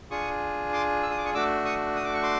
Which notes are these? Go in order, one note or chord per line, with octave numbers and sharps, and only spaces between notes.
D4 F4 G#4 C#6 D#6
C6 D6
E6
D#6
D6
C#6 D#6
A3 D4 F#4 D6 E6
C#6 D#6
D#6
D6
C#6
C6 D6